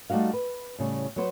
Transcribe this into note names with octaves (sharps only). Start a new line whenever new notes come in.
G3 A3 D#4 F#4 F5
B4
A2 C#3 G3
F#3 B3 C5